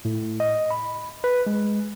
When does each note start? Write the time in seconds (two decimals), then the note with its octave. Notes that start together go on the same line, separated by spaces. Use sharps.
0.05 A2
0.40 D#5
0.71 B5
1.24 B4
1.47 G#3